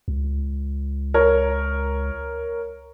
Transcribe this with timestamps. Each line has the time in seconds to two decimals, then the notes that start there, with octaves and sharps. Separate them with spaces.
0.08 C#2
1.14 A#4 C#5